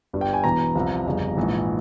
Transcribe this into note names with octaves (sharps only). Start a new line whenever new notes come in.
G1 G2 G3
G5
G#5
E1 E2 E3 A#5
C2 C3 F3
G1 F2 C#3 G3
A#1 G#2 E3